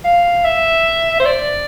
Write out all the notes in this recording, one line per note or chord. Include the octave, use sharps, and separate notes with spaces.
F5
E5
C5
D5